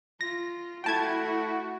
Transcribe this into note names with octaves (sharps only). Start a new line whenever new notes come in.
F4 A#6
A3 E4 F#4 G5 A5 G#6